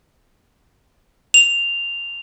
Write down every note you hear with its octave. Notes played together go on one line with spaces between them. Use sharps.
F7